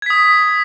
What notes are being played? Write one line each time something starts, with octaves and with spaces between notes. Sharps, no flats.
D#6 G#6 B6